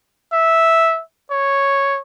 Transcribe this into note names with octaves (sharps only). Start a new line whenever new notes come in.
E5
C#5